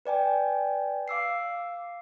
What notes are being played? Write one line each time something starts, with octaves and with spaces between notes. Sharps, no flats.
B4 D5 G5 G#5
F5 D6 E6 C7